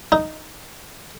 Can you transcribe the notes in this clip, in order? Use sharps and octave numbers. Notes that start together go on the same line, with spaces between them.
D#4